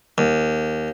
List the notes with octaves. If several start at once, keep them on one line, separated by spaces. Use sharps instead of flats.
D#2